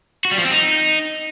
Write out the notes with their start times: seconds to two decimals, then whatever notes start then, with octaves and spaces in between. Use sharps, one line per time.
0.25 F#4
0.31 G3
0.38 F3
0.45 C4
0.51 D#4